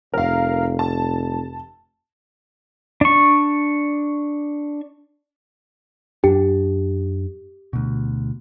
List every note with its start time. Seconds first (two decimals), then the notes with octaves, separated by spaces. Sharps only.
0.14 F1 A#4 F5
0.79 A5
3.01 D4 C#6
6.24 F#2 D4 G4
7.73 D2 B2